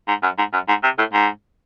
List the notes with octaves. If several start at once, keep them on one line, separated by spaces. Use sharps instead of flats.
G#2
F#2
G#2
F#2
G#2
C3
A2
G#2